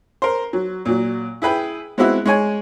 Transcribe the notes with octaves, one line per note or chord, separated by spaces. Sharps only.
A#4 C5
F#3
A#2 F#3
E4 G#4 B4 G5
G#3 B3 C4 E4 F#4 E5
G#3 C#5 G#5